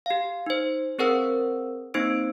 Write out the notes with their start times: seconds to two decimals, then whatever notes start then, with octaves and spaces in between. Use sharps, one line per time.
0.06 G4 F5
0.46 D#4 C5
0.99 C4 G#4 A#4 C5 F#5 E6
1.94 A#3 C4 D#4 C5 E6 D7